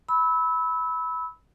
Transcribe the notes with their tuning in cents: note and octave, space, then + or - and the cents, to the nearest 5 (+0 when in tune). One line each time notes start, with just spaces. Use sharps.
B5 +0 E6 -25